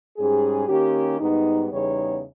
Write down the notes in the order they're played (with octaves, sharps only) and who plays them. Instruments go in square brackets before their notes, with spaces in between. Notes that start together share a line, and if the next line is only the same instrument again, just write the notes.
[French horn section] G#2 G3 C#4 G#4
D#3 A#3 C#4 G4
G#2 G3 B3 D#4
E2 C#3 G3 B3 D#4 C#5